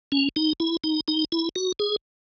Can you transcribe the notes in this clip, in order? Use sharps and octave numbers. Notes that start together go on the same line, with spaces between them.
C#4
D#4
E4
D#4
D#4
E4
F#4
G#4